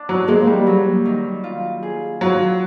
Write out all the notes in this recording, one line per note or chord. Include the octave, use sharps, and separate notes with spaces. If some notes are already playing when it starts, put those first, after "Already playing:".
Already playing: D4
F#3
G#3 A#3
G3
F#3
D#3
F4
G#4
F#3 F4